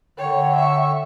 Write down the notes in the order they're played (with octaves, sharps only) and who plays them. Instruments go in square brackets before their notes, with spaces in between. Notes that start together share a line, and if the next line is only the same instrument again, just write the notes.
[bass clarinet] D3 [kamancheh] C#5 [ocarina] G5
[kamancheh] E5 C#6